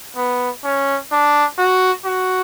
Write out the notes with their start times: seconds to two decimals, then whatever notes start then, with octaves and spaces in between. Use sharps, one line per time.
0.17 B3
0.64 C#4
1.11 D4
1.58 F#4
2.05 F#4